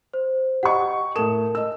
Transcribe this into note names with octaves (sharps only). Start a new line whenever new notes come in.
C5
G4 D#5 F#5 C#6
A2 A4 A#4 A5 E7
D#5 E6